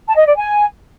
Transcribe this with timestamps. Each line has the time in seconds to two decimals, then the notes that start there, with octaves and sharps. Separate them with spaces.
0.07 A5
0.17 D#5
0.26 D5
0.36 G#5